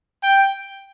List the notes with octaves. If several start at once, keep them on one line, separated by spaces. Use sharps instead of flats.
G5